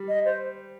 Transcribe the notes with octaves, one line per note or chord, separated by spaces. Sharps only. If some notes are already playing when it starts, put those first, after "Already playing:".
Already playing: G3
D#5
C5